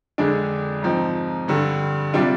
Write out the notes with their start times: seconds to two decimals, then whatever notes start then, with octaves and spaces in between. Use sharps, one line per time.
0.18 F2 D3 G#3 D4
0.82 G#2 F3 C4 D#4
1.48 G2 D3 G3
2.13 C3 G3 D4 F4